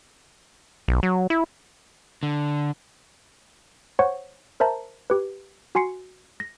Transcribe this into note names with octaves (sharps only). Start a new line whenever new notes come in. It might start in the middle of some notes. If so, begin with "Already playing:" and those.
B1
F#3
E4
D3
C5 C#5 F#5 C#6
A#4 C5 E5 A5 A#5
G4 B4
F#4 G#5 C6 C7 C#7
A#6